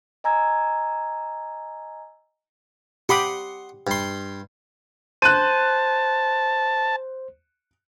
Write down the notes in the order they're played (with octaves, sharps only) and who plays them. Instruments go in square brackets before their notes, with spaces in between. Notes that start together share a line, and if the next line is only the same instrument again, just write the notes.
[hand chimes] D#5 G#5 A#5 E6 G#6
[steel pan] G4 B5 D6 [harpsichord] F#5 C6 D#6
[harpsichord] G2 C6
[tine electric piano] C5 [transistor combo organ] A5 [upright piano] F#6 D#7